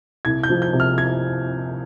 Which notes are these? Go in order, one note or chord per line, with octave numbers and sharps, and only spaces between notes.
C2 G#6
G6
F3
G6
C3
F6
G#6